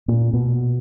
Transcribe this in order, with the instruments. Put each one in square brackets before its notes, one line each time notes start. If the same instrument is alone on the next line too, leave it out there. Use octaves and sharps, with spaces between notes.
[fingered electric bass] A#2
B2